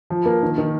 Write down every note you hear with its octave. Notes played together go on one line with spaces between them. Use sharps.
F3
A#3
D#3
D#3